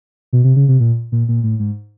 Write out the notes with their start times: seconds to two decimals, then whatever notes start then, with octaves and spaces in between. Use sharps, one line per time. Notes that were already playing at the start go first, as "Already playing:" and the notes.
0.33 B2
0.44 C3
0.56 C#3
0.69 C3
0.80 A#2
1.12 A#2
1.29 A#2
1.44 A2
1.60 G#2